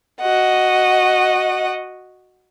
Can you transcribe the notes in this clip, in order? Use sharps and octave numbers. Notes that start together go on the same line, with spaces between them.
F#4 D#5 F#5